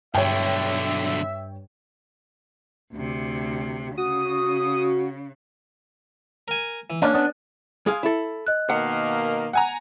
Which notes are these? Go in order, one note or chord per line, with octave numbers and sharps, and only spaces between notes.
B1 G2 D3 C#5 E5 G5
D2 C3
C#3 F#4 D#6
A#4 G#5
E3
A#3 C#4 D4
B3 D4
G#3 G#4 F5
E4 A4
D#5 F#6
B2 D#3 A#3 F#5
F#5 G#5 A#5